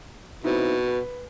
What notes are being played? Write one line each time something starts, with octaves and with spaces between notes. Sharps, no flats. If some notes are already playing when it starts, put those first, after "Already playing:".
B2 C4 D#4 E4
B4